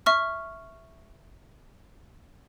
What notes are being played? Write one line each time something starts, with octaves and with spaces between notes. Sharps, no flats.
E5 C#6 F6